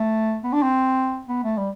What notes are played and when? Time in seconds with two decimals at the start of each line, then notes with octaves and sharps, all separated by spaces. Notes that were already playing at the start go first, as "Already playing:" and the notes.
Already playing: A3
0.44 B3
0.53 D4
0.63 C4
1.28 B3
1.44 A3
1.58 G3